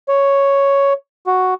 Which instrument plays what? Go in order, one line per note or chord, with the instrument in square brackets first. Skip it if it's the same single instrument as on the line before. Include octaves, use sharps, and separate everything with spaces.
[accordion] C#5
F#4